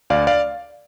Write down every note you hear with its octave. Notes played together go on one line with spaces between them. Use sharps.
D2 D5 F5
D5 F5